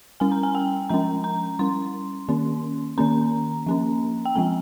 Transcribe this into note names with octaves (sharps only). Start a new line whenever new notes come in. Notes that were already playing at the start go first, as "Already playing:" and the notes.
G3 C#4 G#5
A#5
G#5
G5
F3 G#3 C#4 A#5
A#5
G3 C#4 C6
D#3 A#3 C#4
D#3 A#3 C#4 A#5
F3 A#3 C#4
G5
F3 G#3 C4 G#5